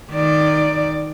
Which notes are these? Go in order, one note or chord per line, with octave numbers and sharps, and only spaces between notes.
D#3 D5